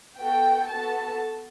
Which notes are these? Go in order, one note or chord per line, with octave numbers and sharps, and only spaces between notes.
B3 F#4 A4 G5
B3 F#4 A4 A5